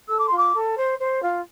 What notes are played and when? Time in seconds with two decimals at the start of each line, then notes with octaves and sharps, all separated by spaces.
0.08 A4 E6
0.18 D6
0.27 F4 C6
0.36 D6
0.54 A4
0.76 C5
0.99 C5
1.22 F4